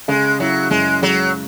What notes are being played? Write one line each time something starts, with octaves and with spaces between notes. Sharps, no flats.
C#3 G#3
F#3 E4
F#2 G#3
F#3 G#3